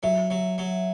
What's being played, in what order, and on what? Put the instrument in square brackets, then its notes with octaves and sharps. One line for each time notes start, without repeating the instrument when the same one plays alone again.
[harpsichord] F#3 [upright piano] E5
[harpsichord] F#3
F#3